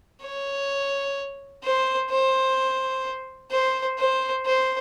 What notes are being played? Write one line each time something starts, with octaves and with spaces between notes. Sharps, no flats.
C#5
C5
C5
C5
C5
C5